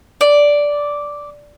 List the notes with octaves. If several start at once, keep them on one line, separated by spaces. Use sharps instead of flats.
D5